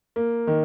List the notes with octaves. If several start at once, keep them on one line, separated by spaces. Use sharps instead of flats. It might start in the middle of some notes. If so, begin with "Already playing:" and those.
A#3
D#3